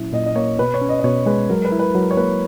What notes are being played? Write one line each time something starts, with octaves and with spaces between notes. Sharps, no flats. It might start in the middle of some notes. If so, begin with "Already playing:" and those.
Already playing: A#2 F#3 C#4 E4
A#2 D#5
D#5
A#3 C#5
B2 B4
C#5
C#4
D#5
D#5
B2 C#5
G#3 B4
F#3 A#4
B4
E4
B4
F#3 A#4
C#5
A#3 B4